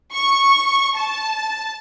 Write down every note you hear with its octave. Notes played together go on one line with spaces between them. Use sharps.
C#6
A5